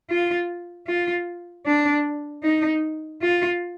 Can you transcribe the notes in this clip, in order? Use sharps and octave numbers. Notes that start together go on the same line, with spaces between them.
F4
F4
D4
D#4
F4